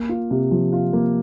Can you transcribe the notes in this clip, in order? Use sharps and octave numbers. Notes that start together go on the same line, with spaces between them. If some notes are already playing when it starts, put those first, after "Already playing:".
Already playing: A#3
F4
C3
F3
F4
A#3